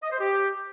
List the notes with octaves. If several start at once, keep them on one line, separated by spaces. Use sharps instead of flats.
D#5
C5
G4